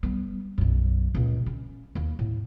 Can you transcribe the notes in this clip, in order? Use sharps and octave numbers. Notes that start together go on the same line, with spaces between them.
G3 B3
B1 F#2
C#2 A#2
C#4
D#2 A#3
A2